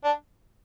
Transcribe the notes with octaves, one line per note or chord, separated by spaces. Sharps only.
D4